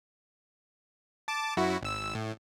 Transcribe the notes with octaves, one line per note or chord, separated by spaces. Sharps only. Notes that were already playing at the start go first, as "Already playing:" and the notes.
A5 D6
F#2 E4 F#4
G#1 E6
A2